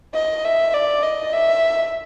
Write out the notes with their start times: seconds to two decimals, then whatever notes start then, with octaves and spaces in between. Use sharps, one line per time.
0.15 D#5
0.44 E5
0.74 D5
1.03 D#5
1.33 E5